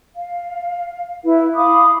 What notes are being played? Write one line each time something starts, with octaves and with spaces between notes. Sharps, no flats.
F5
E4 B4
F5 B5 D6 D#6